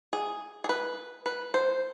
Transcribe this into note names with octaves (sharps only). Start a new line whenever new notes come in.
G#4
G#4
B4
B4
C5